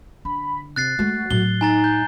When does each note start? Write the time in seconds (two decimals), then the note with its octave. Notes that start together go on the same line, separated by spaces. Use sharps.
0.25 D3 B5
0.76 C3 F#6 A6 C7
0.99 G#3 A3 F#4
1.31 A2 F#3 G7
1.61 D#4 G#5 A#5 A6
1.84 G6